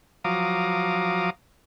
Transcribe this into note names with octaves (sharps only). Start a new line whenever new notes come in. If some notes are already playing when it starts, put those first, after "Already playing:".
F3 F#3 F5 A#5 D6 D#6